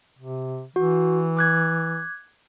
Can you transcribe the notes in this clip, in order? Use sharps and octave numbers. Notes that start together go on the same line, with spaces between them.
C3
E3 F#4
D6 F#6 G#6